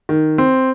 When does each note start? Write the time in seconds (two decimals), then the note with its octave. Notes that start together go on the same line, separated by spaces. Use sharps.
0.09 D#3
0.38 C4